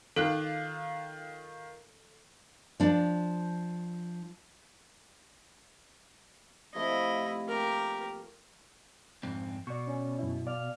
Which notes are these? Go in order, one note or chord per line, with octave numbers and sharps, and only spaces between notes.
D#3 F4 A4 F#6
F3 D4
C3 F3 A3 E4 D#5
A#3 G4 A#4 G5 C#6
F2 G#2 C4
B2 D5 C#6
C#4
F#2 E4
D5 F5 F6